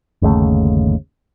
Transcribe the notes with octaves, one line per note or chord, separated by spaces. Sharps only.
G1 D#2 C#3 A3